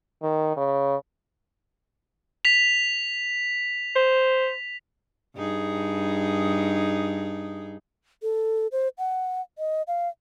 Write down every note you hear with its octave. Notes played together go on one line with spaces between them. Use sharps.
D#3
C#3
B6 F7
C5
G2 D#4 G#4
A4
C5
F#5
D#5
F5